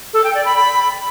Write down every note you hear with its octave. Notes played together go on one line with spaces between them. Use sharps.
A4
G5
D5
B5
B5